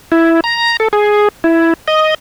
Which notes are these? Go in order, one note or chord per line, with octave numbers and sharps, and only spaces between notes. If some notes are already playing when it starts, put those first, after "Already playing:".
E4
A#5
A4
G#4
E4
D#5